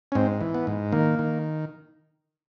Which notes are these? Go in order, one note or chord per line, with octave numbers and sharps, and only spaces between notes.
C#4
G#2 C4
E3
B3
G#2
D#3 A#3
D#3